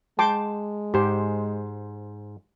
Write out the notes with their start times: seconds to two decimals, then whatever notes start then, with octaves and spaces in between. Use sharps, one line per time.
0.19 G#3 G5 A5 C6 D6
0.94 G#2 G4 C5